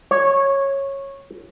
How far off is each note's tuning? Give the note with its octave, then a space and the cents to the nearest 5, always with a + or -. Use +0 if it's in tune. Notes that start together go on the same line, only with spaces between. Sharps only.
C#5 -15